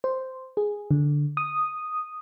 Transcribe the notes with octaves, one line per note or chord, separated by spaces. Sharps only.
C5
G#4
D3
D#6